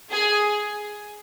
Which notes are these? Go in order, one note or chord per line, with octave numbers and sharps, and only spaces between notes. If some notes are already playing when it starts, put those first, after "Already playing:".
G#4